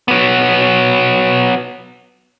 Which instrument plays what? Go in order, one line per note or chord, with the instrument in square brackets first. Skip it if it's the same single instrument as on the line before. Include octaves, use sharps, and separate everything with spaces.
[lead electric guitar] F#3 B3